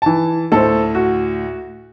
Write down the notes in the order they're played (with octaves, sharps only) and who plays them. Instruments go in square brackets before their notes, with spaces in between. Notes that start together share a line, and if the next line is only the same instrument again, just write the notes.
[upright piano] E3 A5
[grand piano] D2 A2 [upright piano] A4 C5
[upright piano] F#4